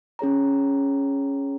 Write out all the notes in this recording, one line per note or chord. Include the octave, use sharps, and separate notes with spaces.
C#4 G#4 C#5 A#5